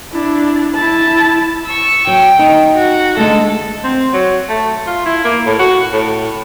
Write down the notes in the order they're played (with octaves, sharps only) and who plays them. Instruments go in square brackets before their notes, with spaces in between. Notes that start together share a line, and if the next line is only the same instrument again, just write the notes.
[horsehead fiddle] D4 E4
E4 A5
[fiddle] C#6 E6
[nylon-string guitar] F#3 [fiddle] G5
[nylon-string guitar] D#4
[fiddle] F#4
[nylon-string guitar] D3 G#3 A3 [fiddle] A4
[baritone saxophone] C4
F#3
A3
F4
E4
A#3
A2
F#4
A2